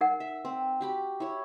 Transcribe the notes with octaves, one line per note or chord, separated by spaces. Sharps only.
D#4 A#4 F#5
E5
C4
F#4 G4 B5
E4 C#5